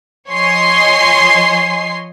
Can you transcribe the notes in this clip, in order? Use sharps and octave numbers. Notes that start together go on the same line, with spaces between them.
F3 C#5 D#5 G#5 C6 C7